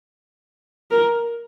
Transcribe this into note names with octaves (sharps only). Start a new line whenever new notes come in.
A#4